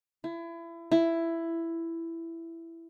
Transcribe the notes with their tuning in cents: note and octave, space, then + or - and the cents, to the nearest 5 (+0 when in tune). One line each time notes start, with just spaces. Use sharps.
E4 +30
E4 +10